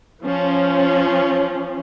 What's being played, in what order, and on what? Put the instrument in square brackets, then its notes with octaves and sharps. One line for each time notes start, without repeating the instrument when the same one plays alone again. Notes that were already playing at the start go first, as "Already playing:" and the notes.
[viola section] F3 C#4